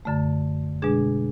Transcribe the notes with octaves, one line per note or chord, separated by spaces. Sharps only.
F#2 D3 A3
B2 G#3 D4 G#4